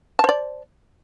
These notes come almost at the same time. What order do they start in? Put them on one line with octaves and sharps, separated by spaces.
A5 C5 D5